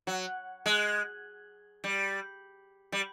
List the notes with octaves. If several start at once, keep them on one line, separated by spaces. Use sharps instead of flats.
F#3
G#3
G3
G3